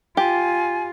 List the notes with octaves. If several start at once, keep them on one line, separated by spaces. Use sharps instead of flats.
F4 G4 G#5